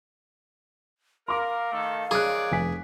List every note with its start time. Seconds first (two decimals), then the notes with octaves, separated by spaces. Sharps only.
1.28 A#4 F5 C6 D6
1.72 D#3 A3 A4
2.11 D#3 G#4 C#5 D5 D6 F#6
2.52 F1 G#5 B6